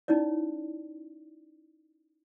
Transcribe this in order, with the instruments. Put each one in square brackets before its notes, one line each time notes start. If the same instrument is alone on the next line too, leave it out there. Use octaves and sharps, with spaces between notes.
[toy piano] C#4 D#4 E4 C#5 D5